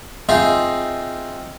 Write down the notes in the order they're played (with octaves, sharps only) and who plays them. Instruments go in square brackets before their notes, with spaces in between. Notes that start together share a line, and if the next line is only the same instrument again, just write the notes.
[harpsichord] C4 D#4 F4 G#4 E5 F5